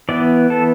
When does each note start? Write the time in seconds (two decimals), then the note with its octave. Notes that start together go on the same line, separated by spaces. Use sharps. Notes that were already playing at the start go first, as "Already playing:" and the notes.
0.09 E3 B3 D5
0.50 A4